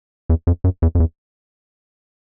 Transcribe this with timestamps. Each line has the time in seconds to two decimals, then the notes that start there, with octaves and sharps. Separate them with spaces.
0.29 E2
0.47 F2
0.64 F#2
0.82 E2
0.95 F2
1.00 E2